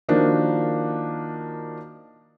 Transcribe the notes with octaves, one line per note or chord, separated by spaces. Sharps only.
D#3 F3 A#3 D4 D#4 F#4